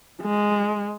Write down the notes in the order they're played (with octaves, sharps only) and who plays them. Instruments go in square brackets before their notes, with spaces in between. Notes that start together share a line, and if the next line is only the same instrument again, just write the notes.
[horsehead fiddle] G#3